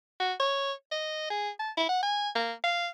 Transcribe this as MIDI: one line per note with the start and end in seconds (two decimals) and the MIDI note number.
0.20 0.33 66
0.40 0.72 73
0.92 1.27 75
1.30 1.50 68
1.59 1.71 81
1.77 1.85 64
1.89 2.02 78
2.03 2.29 80
2.35 2.52 58
2.64 2.88 77